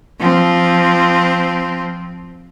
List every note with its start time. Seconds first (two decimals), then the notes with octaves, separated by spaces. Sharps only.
0.20 F3 C4